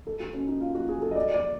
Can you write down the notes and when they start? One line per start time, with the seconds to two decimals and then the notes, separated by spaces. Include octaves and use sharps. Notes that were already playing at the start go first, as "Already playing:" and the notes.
0.07 A4
0.20 F#4
0.34 C#4
0.47 D#4
0.61 F4
0.75 F#4
0.89 G#4
1.02 A4
1.11 D#5
1.16 D5
1.34 D5